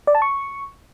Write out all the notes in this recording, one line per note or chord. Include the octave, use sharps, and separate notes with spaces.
D5
A5
C#6